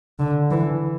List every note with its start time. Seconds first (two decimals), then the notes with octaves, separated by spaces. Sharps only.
0.19 D3
0.51 E3